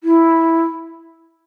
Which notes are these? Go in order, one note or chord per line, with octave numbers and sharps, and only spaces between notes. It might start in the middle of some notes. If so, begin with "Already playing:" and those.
E4